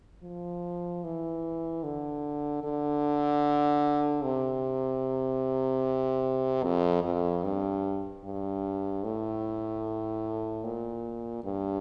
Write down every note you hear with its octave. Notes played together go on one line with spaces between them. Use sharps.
F3
E3
D3
D3
C3
F2
F2
G2
G2
A2
A#2
G2